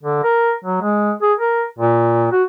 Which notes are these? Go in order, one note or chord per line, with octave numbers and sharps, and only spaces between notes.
D3
A#4
F#3
G#3
G#4
A#4
A#2
F#4